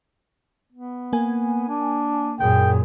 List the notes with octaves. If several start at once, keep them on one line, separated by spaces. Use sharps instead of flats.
B3
A#3 G#5
D4
F#2 A#2 G#4 G5